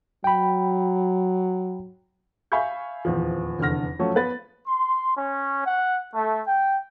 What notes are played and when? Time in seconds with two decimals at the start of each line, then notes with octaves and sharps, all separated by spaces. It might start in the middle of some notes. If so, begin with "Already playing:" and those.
0.24 F#3 G5 B5
2.52 E5 F5 G#5 B5 C#6 G6
3.05 D#1 E2 F3
3.59 F1 E2 D3 F6 A#6
3.99 F3 F#3 A3 C#4 A4
4.15 B3 B4 A6
4.67 C6
5.16 C#4
5.66 F#5
6.13 A3
6.47 G5